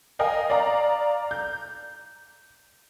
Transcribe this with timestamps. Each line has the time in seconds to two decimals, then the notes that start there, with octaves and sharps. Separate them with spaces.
0.19 A#4 D#5 F5 G5 G#5
0.50 D5 F5 A#5
1.31 G6